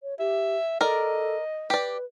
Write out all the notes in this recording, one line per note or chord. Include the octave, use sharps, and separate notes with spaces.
C#5
G4 E5
A4 A#4 D5 D#5
G4 B4 D5